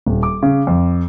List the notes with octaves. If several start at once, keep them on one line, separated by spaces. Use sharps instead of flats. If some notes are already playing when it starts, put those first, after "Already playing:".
D#1
D6
C#3
F2